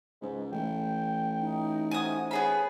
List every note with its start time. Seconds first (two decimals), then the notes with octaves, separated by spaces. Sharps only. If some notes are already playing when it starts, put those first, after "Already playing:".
0.22 C#2 G#2
0.52 A1 G5
1.40 D#4
1.91 A3 F#4 C5 G#5 D#6
2.31 B3 G#4 C#5 B5